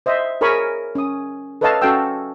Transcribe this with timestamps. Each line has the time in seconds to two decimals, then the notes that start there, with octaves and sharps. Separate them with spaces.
0.06 C5 D#5 E5
0.41 G#4 A#4 C#5 G#5 B5 C#6
0.95 C#4 D#6
1.61 A4 B4 C#5 D#5 F5 A5
1.82 C#4 F#4 A4 F5 G5 E6